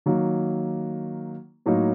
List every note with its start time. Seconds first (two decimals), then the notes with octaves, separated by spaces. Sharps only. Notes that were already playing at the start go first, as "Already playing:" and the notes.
0.06 D#3 F#3 A#3
1.66 A2 F#3 A#3 D#4